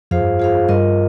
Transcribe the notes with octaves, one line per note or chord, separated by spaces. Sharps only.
F2 F4 G#4 C5 F5
G2
F4 G#4 C5 F5
G2 F4 A#4 D#5